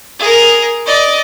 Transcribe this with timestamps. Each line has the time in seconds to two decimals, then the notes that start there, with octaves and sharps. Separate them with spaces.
0.20 G#4 A#4
0.86 D5 D#5